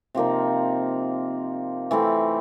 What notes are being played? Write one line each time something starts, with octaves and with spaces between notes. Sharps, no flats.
C3 F3 A#3 D#4
E3 A3 C4